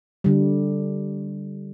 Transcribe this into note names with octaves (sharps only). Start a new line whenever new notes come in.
D3 G3